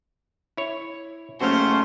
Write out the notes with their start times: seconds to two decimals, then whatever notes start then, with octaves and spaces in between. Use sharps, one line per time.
0.57 E4 C#5
1.40 F#1 A3 C#4 F#4 C5 F5